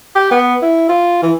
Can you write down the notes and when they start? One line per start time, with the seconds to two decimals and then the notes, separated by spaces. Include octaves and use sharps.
0.15 G4
0.31 B3
0.62 E4
0.89 F4
1.23 E3